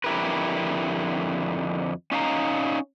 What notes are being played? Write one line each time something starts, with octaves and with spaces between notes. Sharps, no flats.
F2 D3 E4 G4 A#4 B4
C#4 D#4 F5 A5 A#5